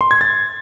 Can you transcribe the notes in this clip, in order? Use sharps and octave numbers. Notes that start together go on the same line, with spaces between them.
C6
G#6
A6